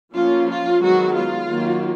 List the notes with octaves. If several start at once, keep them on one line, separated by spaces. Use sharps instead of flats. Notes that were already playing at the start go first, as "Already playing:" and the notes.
F3 A#3 C#4 F4
F4
D#3 F#3 G#3 B3 F#4
F4
D#3 F#3 A#3